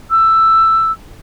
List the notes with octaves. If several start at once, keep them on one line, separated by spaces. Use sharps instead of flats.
E6